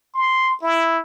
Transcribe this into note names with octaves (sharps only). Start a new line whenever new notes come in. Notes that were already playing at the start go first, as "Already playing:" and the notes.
C6
E4